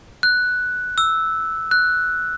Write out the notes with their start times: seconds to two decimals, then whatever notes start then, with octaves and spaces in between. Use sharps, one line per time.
0.23 F#6
0.98 E6
1.71 F#6